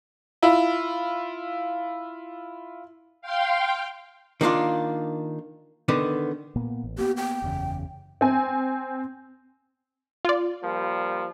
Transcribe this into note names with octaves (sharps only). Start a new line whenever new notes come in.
E4 F4
F5 G5 C6
D#3 A#3 D4 F4
D3 D#3 B3
A#2 A#3 B3
A1
A#3 B3 G4
G5
F#1 E2 C#3
C4 G#5
F4 D5
F3 G3 A#3